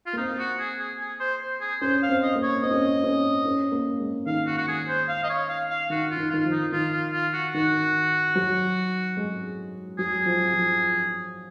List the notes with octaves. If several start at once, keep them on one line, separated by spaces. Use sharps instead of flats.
F4
A#3
C4 D#4
F#4
G#4
G#4
G#4
C5
C5
G#4
C#4 C5
F5
C4
D#5
A#3
C#5
C4 D#5
C#4
C4
C#4
C#4
A#3
G#3
D#3 F5
F#4
F#4
G#4
C5
F5
D#5
C#5
F5
F5
D#3 F#4
F4
D#3
D#3 F4
F3
D#4
D#3 F4
F4
F4
F#4
D#3 F#4
F#3
G#3
F#3 G#4
F3
F3